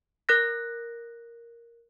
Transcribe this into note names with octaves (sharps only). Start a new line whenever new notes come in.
A#4 F#6 A#6